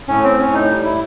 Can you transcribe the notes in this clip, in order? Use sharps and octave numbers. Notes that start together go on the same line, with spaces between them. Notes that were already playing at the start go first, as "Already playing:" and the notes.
A2 C#4
C4
A2 C#4
D#4
G3
E4